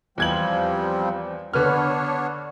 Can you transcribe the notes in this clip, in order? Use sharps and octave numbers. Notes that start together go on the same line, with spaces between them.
E2 F3 G3 C4 G#6 F#7
D3 B3 D4 B4 C#5 F6